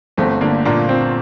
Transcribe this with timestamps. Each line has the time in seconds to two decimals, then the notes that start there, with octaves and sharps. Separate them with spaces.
0.17 G1 A3 C4
0.41 D3 A#3 D4
0.65 A#2 A#3 D4
0.89 C4